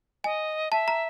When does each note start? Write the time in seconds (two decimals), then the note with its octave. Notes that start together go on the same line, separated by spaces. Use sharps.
0.24 D#5 G#5
0.71 E5 A5
0.88 A#5